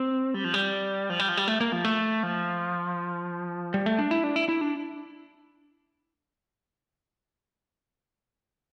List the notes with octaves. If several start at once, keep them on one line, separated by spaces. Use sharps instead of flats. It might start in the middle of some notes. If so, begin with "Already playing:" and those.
Already playing: C4
G3
F3
G3
F3
G3
F3
G3
A3
A#3
F3
A3
F3
G3
A3
D4
E4
D4
E4
E4
D4